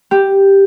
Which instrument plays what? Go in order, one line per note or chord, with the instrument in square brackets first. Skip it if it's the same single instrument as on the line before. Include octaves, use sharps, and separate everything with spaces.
[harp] G4